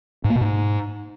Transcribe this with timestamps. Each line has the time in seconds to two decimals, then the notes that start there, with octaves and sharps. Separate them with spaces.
0.24 G#2
0.30 A#3
0.36 B2
0.41 G#2